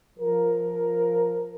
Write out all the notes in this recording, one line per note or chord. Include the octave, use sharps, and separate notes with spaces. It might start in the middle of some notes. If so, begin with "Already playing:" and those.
F3 A#4